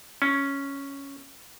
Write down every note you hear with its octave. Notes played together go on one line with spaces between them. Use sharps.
C#4